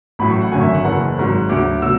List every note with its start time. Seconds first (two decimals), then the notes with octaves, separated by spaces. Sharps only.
0.19 A1 A2 F#3 B5
0.30 C#6
0.42 F#5
0.52 G#1 F#2 D3 F#3 G#5
0.63 E5
0.74 F#5
0.85 F#1 F#2 E3 F#5
1.18 G#1 G#2 F#3
1.49 D2 D3 F#3 D6
1.82 B2 F#3 E6